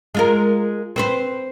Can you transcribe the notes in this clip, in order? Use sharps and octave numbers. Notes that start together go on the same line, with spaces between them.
G#3 F4 A#4
C4 B4 C5